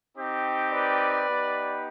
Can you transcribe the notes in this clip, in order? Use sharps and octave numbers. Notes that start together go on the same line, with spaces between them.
C4 D#4 G4
B4 D5
B3 D#4 G4